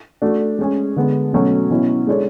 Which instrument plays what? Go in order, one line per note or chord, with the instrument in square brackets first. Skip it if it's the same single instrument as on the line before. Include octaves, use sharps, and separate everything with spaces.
[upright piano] A3 D4 F#4
G#3 C#4 G#4
D3 G#3 B3
B2 F#3 A3 C#4 F#4
B2 F#3 C#4 E4
G#3 D4 A4 C#5